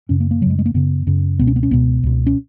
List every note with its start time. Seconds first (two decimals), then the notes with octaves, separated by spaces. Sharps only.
0.09 F#2 C#3 C#4
0.20 A#3
0.31 A#3
0.41 C#3 F#3
0.46 F#2 G#3
0.59 G#3
0.66 A#3
0.74 F#2 C#3 B3
1.07 F#2 C#3
1.39 C#2 B2 B3
1.47 C#4
1.56 B3
1.63 C#4
1.71 C#2 B2 B3
2.03 C#2 B2
2.27 C#4